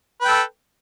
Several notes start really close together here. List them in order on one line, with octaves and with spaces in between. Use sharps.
B4 G5 A4